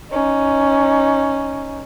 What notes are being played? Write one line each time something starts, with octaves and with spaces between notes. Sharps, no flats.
C#4 D#4